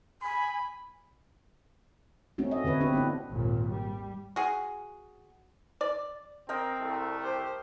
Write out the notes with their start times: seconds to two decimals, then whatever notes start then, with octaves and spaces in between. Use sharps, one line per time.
0.22 G#5 B5
2.38 A3 C4 C#4 D#4 F#4
2.51 D#5 E5
2.64 D3 C4 B4 C#5
2.80 B3 C4 D4 G4 B4
2.93 B3 C#4 E4
3.30 G#1 D#2 A#2
3.73 G3
4.36 F#4 G#4
5.81 D5
6.49 C4 A#4 D#5 G5
6.80 C2 A3
7.23 G4 C5